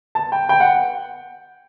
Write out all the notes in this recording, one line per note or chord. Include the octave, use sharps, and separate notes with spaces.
A5
G5
G5
F#5